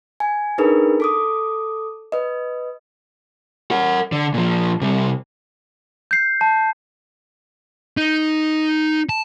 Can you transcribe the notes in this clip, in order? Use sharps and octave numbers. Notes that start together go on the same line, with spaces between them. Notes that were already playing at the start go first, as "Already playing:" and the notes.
G#5
D4 D#4 G#4 A#4 B4
A4 D6 D#6
B4 D#5
A#4 F#5
D3
A#2 F3
C3 G3
G6 C7
A5
D#4
A5